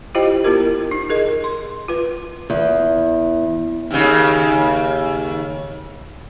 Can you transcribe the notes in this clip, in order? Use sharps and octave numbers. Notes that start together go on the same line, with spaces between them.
E4 F4 G4 C5 D#5 G5
B3 E4 F4 G4 A#4
D#4
G#4 A#4 D#5
C6
F4 B4
E2
D#2 C#3